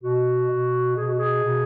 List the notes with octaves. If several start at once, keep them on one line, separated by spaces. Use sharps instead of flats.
B2 F#4
B2
B2 G#4
F#4
G#4
B2